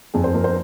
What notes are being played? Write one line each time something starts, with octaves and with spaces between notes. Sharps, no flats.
F2 G#4
C5
F2 A#4
C5